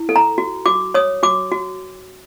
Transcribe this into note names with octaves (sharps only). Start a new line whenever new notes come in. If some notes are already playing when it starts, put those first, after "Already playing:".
Already playing: E4
A4
A#5
F#4
F#4 D6
C#5 D#6
F#4 D6
F#4